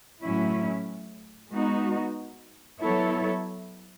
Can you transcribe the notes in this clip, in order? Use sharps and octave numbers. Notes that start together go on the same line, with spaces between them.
A2 F#3 C#4 E4
G#3 B3 D#4 F#4
F#3 B3 E4 A4 C#5